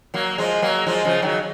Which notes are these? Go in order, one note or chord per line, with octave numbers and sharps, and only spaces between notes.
F#3 A#3
F3 G#3
F#3 A#3
F3 G#3
C#3 F3
D#3 F#3